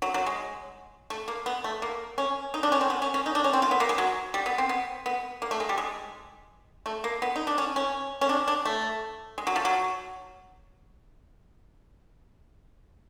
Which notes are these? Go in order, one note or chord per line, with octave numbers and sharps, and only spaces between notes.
F#3
F#3
G#3
A3
A#3
B3
A3
A#3
C#4
D#4
D4
C#4
C4
B3
C#4
C#4
D#4
D4
C#4
C4
F4
B3
A#3
G#3
F#3
G3
B3
C4
B3
B3
A#3
A3
G#3
G3
G#3
A3
A#3
B3
D#4
D4
C#4
C#4
C#4
D4
D4
A3
G#3
F#3
F3
F#3